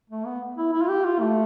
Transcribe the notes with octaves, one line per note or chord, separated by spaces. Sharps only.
A3
B3
E4
E4
F4
G4
F4
A3